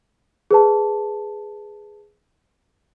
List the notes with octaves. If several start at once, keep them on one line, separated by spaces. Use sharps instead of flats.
G#4 B4 A5